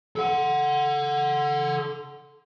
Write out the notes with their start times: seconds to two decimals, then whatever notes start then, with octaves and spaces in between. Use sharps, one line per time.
0.16 A4 F#5